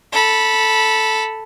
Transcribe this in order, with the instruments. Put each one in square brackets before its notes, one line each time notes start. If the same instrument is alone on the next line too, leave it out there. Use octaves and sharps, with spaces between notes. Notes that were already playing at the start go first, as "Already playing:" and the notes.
[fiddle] A4 B5